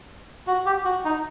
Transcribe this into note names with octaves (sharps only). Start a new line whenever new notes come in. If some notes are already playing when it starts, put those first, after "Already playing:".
F#4
G4
F#4
D#4